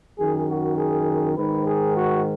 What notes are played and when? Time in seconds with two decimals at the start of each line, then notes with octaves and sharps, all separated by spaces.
0.19 F#2 D#3 G#4
0.49 F#4
0.78 G#4
1.37 G#2 D#3 B4
1.67 G#4
1.97 F#4